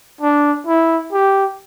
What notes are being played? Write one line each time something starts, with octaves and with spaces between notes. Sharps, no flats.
D4
E4
G4